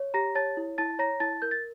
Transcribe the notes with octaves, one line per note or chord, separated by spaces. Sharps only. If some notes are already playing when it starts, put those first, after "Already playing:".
Already playing: C#5
G4 A#5 A#6
C#5 A5 A6
E4
E4 A5 A6
C#5 A#5 A#6
E4 A5 A6
A#4 G6
A6